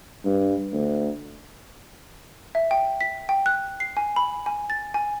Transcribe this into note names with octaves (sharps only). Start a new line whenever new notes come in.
G2
D2
E5
G5
B6
G5
F#6
C7
G#5
B5
G#5
A6
G#5